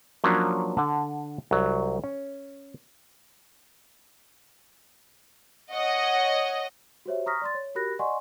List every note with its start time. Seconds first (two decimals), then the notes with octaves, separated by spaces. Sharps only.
0.24 F3 F#3 A#3 C#4 D4
0.77 D3 F#5 A5
1.51 C2 F#3
2.04 C#4
5.72 C#5 D#5 F#5
7.05 F#4 G4 C5 C#5 E5
7.26 A#5 C#6 D#6 F6 A#6 B6
7.42 D5 C6 A6
7.54 C#5
7.75 F#4 G4 A#4 B5 F#6 A#6
7.99 D5 D#5 F#5 G#5 C6 C#6